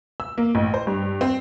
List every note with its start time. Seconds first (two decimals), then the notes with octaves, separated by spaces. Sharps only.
0.20 E6
0.38 A#3
0.55 A1
0.74 C5
0.87 G2
1.21 C4